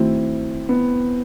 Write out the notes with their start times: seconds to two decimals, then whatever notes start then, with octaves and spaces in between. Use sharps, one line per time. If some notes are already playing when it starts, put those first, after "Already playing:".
Already playing: D#3 A3 C4 D#4 E4 F#4
0.69 B3